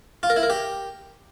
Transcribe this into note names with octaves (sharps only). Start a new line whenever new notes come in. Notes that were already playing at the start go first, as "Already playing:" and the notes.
F4
A#4
E4
A#4
G4